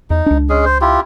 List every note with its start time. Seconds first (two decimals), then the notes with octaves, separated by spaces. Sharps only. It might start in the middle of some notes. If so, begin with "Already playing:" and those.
0.10 E2 D#4
0.26 C#2 D4
0.49 G#3 C#4 G#4
0.65 C5
0.81 E4 F4 G4